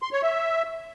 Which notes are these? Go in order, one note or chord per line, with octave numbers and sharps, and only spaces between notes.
C6
C#5
E5